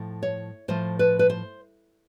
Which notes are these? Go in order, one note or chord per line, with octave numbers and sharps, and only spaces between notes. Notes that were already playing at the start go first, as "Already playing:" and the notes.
Already playing: A2 F3
C#5
A2 F3 C5
B4
B4
C5